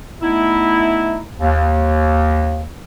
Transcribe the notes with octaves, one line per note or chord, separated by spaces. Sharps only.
A3 B3 D#4 E4
D#2